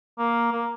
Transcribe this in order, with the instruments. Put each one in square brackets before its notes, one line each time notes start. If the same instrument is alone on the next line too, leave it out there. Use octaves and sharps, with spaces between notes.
[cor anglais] A#3
A#3